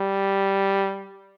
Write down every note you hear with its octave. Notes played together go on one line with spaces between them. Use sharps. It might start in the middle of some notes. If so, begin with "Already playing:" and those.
Already playing: G3